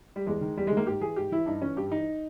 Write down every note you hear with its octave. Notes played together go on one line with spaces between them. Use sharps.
G3
E2 G#3
D#3
E2 G3
D#3 G#3
A#3
G#2 G4
E3 G#4
G#2 G4
E3 E4
G2 D#4
E3 C#4
G2 G4
E3 D#4